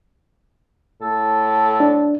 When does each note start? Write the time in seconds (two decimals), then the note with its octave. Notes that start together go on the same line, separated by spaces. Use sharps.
1.02 A2 A4
1.80 D4